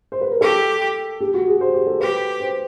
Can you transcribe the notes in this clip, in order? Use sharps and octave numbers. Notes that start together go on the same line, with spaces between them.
C5
B4
A#4
G4 A4
G4
F#4
G#4
C5
G4
A4
G4 B4
C5